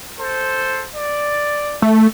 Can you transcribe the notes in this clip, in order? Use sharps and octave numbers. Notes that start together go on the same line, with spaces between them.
A4 C5
D5
A3